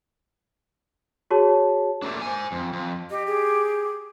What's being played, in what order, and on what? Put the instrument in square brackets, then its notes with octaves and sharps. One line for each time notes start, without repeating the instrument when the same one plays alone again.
[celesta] F#4 G#4 C#5 A5
[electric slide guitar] A3 A#3 D4
C5 G#5
F2
F2
[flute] G4 [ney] D#5
[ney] G#4